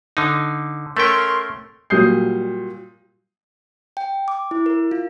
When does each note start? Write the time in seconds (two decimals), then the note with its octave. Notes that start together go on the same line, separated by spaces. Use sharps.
0.17 D3 D#4
0.97 A3 C#4 A#4 G5 C6 C#6
1.90 A#2 F#3 G3 D#6 G6 C7
3.97 G5
4.28 D6
4.51 E4
4.66 A#4
4.91 F4